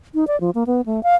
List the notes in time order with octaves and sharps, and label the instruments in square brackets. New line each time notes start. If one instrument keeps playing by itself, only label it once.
[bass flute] D#4
D5
F3
A#3
B3
A3
F5